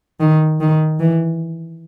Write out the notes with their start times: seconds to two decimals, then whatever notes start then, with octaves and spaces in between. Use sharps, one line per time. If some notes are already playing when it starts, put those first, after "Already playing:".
0.20 D#3
0.60 D#3
1.00 E3